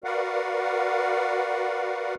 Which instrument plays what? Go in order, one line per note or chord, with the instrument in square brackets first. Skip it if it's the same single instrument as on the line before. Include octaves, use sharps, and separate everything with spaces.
[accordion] F#4 A#4 B4 D5 F5 F#5